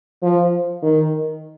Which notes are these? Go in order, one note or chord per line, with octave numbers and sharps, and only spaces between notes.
F3
D#3